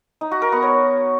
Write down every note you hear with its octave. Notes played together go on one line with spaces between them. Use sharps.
D#4
F#4
A#4
B3
C#5